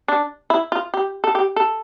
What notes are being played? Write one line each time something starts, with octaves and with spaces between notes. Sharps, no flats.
D4
E4
F4
G4
A4
G4
A4